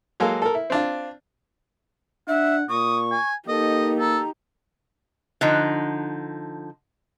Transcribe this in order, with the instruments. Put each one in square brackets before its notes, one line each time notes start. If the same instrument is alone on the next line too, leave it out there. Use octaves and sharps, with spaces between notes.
[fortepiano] F#3 G#3 A#3 A4 F5
A4 A#4
E4
C4 D4 F4
[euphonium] D4 [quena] E5 [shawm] F#5
[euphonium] A#2 [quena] C#6 [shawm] D#6
[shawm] G#5
[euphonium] A#3 [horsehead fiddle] D#4 G4 [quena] A4 [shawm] D#5
[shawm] A4 [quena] A#5
[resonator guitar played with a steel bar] D3 F3 D#4